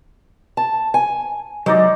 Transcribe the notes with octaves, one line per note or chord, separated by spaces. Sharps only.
A5
G#5
F#3 G#3 D#4 D5